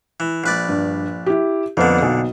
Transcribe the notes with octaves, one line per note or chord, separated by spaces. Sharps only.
E3
A#1 B4 D5
G2
E4 G4
F2 A#2 D3 B3
B1